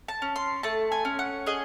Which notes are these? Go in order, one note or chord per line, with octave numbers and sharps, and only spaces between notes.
A5
C#4
C6
A3 A5
G#5
C#4
F#5
G#4 D#5